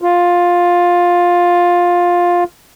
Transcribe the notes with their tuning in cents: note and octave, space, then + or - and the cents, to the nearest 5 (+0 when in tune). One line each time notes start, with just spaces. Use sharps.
F4 +10